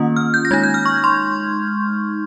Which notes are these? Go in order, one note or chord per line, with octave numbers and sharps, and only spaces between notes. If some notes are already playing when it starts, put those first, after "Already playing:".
Already playing: D#3 A#3 C#4 F4 D#6
F6
G6
A#6
G#3 D#4 G#6
G6
F6
C#6
C6